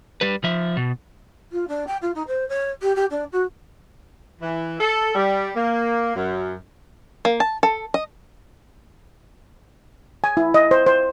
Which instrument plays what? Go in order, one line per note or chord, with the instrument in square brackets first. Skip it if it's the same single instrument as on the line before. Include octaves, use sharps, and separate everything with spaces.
[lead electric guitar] G3 B4
F3 E5
B2
[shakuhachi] F4
D4
G5
F4
D#4
C5
C#5
G4
G4
D4
F#4
[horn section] E3
A4
G3
A#3
F#2
[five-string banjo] A#3
A5
A4
D#5
[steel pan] G#5
E4
D#5
C5
C5